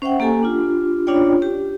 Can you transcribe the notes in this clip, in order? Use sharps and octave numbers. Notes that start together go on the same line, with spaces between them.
C#4 C5 E5 F#5 G5
A#3 G4 A4 G#5 A#5
D4 F4 G4
C#4 D4 F4 C#5 D5 G5
G4